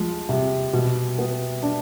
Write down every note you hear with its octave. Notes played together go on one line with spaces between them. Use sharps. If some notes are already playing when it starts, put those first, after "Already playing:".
Already playing: F3 G#3
C3
B2
B3
D4